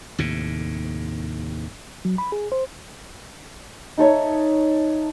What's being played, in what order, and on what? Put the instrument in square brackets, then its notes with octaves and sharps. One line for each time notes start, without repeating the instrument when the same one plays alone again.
[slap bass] D#2 A2 C3
[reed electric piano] F#3
B5
G#4
C5
[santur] D#4 A4 C#5 E5